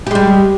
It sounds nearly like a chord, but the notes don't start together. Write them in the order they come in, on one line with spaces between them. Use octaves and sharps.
G4 G#3 G3